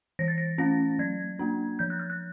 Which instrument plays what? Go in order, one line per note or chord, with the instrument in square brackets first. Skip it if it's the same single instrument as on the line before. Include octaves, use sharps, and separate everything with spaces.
[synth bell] E3 A#6
A6
A#6
A3 C#4 A#6
F#3 G#6
A#3 D4
F3 G6
F#6
F6
F#6